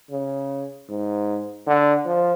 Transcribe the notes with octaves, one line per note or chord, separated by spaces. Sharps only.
C#3
G#2
D3
F3